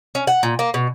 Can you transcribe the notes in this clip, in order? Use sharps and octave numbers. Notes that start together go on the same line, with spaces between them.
C#4
F#5
A#2
A#3
B2